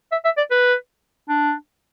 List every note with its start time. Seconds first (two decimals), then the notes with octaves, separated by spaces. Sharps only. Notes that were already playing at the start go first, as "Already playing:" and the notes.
0.12 E5
0.25 E5
0.38 D5
0.51 B4
1.29 D4